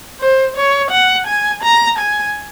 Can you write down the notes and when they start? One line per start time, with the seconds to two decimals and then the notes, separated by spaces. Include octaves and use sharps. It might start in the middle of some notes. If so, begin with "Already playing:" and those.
0.20 C5
0.56 C#5
0.91 F#5
1.27 G#5
1.63 A#5
1.99 G#5